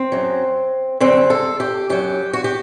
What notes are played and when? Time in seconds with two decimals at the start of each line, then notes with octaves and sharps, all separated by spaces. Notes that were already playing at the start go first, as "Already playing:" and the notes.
Already playing: C4
0.12 F#2 F#3
1.00 F#2 D3 G3 C4
1.30 A4
1.60 G4
1.90 F#2 F#3 G4
2.33 F#4
2.44 G4